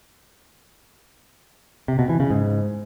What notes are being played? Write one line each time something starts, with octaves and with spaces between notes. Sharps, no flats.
C3
B2
E3
C#3
G#2